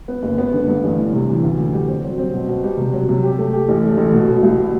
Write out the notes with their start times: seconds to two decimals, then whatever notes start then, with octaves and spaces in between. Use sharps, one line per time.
0.08 B3
0.22 F#1
0.38 B3
0.54 D3
0.67 G2
0.84 A1
0.98 E3
1.13 C3
1.28 E3
1.43 D2
1.58 D3
1.73 G3
1.88 C4
2.03 F#3
2.18 C4
2.33 B2
2.48 B2
2.64 G3
2.77 C3
2.93 F#3
3.09 C3
3.23 G4
3.38 A3
3.53 G4
3.68 A1
3.83 A3
3.97 A1
4.13 B2
4.29 B2
4.43 C2